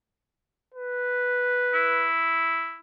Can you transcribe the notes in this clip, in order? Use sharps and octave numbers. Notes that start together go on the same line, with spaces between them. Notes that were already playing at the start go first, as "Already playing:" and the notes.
B4
E4